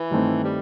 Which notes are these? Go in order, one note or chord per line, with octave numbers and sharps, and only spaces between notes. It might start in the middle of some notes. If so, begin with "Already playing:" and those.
Already playing: E3
G2 D#3 A3 C4
G3